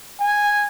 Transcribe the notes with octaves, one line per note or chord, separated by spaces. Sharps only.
G#5